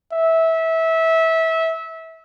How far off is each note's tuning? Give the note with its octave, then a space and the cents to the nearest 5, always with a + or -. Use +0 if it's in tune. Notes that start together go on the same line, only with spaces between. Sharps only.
E5 -20